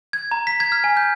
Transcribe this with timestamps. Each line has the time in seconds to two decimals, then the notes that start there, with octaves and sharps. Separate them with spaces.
0.13 G#6
0.31 A#5
0.47 B6
0.60 G#6
0.72 F6
0.84 G#5
0.97 G6